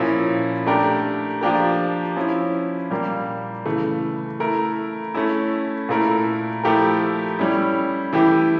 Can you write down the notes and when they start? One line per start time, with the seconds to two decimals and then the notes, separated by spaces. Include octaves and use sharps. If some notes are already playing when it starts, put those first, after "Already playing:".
Already playing: A#2 F3 C#4 E4
0.67 A3 D4 G4 A#4
1.41 F3 A#3 D4 G4 A#4
2.16 F3 C#4 E4
2.91 A#2 G3 A#3
3.65 C#3 E3 A3
4.40 A3 E4 A#4
5.15 A3 C#4 E4
5.89 A#2 A3 E4 A#4
6.63 F3 A3 E4 G4 A#4
7.39 G3 C#4 E4
8.13 E3 A3 E4 G4